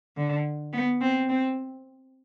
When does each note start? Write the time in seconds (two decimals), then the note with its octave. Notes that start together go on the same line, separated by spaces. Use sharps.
0.17 D3
0.73 B3
1.01 C4
1.29 C4